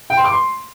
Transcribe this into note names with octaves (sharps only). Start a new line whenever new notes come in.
G5
C6
D6
C6